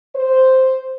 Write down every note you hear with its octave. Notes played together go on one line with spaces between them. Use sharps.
C5